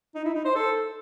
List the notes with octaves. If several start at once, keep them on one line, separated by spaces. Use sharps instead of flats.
D#4
E4
D#4
C5
A4